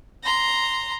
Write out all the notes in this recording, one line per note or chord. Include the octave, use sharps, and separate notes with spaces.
A#5 C6